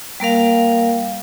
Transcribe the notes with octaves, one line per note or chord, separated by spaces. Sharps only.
G3 A#3 A#4 F5